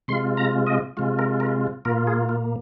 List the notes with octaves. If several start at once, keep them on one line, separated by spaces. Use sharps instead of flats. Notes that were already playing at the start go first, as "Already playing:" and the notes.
C3 G#3 F4 C6
A#5
D#5
C3 G#3 F4
A#4
A#4
A#2 A#3 F4 A#4
G#4
F4